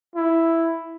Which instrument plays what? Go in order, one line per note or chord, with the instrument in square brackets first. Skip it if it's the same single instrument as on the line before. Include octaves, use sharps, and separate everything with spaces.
[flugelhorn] E4